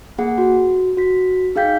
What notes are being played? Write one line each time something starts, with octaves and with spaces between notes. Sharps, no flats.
A#3 G#4 F#5
F#4
F#4 B6
D#4 G#4 F5 G5 G6 B6